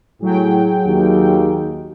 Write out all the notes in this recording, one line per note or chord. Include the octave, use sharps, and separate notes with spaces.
A2 F#3 F#4 G#4 G5
D#2